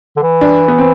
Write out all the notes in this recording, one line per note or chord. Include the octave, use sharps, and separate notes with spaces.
D3
E3
D4
B3
C4